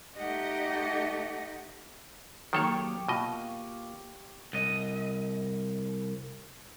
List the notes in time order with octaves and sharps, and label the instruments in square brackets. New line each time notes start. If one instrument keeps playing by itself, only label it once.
[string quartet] A3 D#4 G4 D#5 F#5
[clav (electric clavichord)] D#3 A4 C#5 [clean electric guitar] F#3 A#3 [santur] G4 G5 C#6
[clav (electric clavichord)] B2 D#5 [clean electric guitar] A#3 F4
[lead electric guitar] C2 D#5